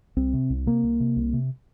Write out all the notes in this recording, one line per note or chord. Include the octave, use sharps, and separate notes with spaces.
C2 C4
C3
C2
C3 A#3
C2
C3
C2
C3